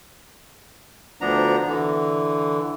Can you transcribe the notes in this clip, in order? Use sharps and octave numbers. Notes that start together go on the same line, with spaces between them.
D2 F3 B3 D4 A#5
D3 E3